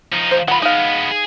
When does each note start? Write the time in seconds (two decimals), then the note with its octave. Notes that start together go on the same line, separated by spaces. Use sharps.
0.13 F3 D#4
0.31 C5
0.48 D#3 F4 F#5 B5
0.62 G#3 B3 D#4 F5
1.11 G#4